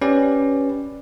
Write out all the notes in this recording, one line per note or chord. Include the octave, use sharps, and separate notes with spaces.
C#4 G4 B4 D5